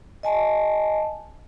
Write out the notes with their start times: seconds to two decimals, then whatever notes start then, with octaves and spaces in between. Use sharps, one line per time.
0.23 D#5 G#5 A5